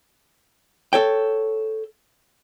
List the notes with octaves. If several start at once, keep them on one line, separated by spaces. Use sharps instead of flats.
A4 C#5 G5